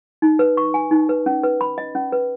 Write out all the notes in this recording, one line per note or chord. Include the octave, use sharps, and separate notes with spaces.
D#4
B4
C#6
G#5
D#4
B4
C#4
B4
B5
D#5
C#4
B4